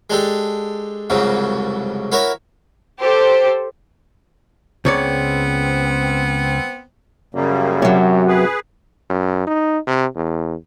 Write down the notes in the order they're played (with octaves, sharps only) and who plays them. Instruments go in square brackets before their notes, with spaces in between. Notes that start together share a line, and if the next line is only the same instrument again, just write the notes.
[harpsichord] G#3 D4 G4 A4
C2 F2 G#2 C#3 F#3
E4 F#4 A#4 C#5 E5
[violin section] G4 A4 C5
[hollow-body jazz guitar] C#2 C#5 D5 [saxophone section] B3 C4
[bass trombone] F#2 [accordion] C#3 G3 A#3
[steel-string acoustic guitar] C3 F#3
[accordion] G#4 B4
[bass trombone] F#2
D#4
C3
E2